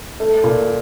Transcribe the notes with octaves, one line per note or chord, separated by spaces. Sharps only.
A3
A#2